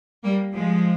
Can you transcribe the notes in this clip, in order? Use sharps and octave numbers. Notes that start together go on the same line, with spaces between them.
G3 A#3
F3 G#3